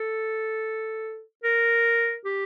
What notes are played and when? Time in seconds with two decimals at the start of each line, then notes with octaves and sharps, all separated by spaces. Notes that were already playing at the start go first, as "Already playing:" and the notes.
Already playing: A4
1.44 A#4
2.25 G4